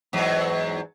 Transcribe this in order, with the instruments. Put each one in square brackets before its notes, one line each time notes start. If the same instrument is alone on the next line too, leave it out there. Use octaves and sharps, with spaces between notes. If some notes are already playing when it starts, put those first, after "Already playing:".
[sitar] E2 G#2 F#3